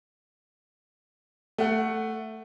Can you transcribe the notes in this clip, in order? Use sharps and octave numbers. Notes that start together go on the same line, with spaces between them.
A3 F#5